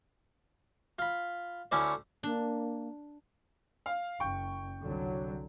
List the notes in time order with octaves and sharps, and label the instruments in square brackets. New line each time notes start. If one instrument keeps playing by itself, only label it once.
[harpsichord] F4 B5
D2 C#4 E4 D5
[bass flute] A#3 [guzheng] D4
[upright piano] F5
[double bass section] F#1 [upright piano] G5 C#6
[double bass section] C2 D3 F#3